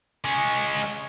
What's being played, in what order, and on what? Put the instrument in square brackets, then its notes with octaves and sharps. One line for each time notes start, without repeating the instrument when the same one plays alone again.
[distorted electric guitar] G#3 C#4